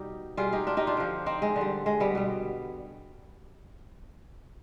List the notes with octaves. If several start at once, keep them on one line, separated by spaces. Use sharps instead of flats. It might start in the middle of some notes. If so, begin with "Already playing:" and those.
Already playing: B2 G3 D#4 G4
B2 G3 F4 G#4
D#4 G4
D4 F4
D#4 G4
D4 F4
D3 F3
C4 D#4
G#3
D3
G3
G#3
G3 B3
B2 G3